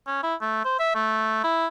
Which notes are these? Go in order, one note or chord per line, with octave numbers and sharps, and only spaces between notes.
C#4
E4
A3
C5
E5
A3
E4